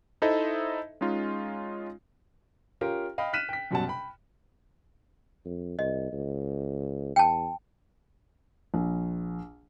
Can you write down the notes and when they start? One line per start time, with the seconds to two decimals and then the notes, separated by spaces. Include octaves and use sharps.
0.22 D#4 E4 A4 C5 D#5 E5
1.01 G#3 C#4 D#4 F4
2.81 C#4 F4 G4 A#4 G5
3.18 D#5 F5 G5 B5
3.33 F6 F#6 B6 D#7 E7
3.49 G5 B6
3.71 F#2 B2 F#3 G3 F#5 A5
3.88 G5 B5
5.46 F2
5.79 C2 D#5
6.13 C#2
7.16 E2 G5 A5
8.74 A#1